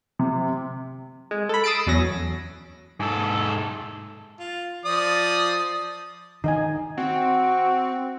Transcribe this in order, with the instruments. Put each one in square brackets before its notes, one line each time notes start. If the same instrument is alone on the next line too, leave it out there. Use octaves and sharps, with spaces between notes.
[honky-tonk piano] C3
[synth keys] G#3
A4 B5
D#6 E6 A6 C7 D7
E2 F#3 C#4 A#6
[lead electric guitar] G#2 A4
[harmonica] F4
F3 D5 D#6
[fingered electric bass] D#3 [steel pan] D#4 D#5 G#5
[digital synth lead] C4 [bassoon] F#4